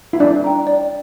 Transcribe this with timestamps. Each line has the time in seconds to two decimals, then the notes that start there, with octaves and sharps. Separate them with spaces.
0.13 E4
0.20 D4 D5
0.44 G5 A#5
0.67 D5